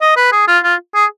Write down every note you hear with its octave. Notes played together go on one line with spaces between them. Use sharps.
D#5
B4
G#4
F4
F4
G#4